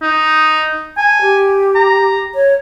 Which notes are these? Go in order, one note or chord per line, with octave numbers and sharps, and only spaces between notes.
D#4
G#5 A5
G4
A#5
C#5